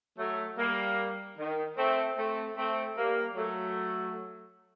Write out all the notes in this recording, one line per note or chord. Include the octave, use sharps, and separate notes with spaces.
F#3 A3
G3 A#3
D#3
A3 C4
A3 C4
A3 C4
G3 A#3
F#3 A3